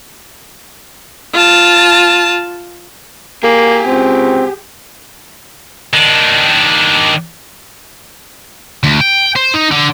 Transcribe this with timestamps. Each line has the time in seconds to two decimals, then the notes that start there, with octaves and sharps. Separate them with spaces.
1.33 F4 A5
3.43 A#3 G4 G#4
3.86 C#2 C4
5.93 D#3 D4
8.83 D2
9.01 G5
9.36 C5
9.54 D#4
9.71 D3